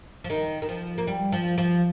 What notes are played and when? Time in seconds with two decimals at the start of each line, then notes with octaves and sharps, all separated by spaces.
0.24 F3
0.30 D#3
0.62 D#3
0.69 F3
0.98 A#3
1.07 G3
1.33 F3
1.58 F3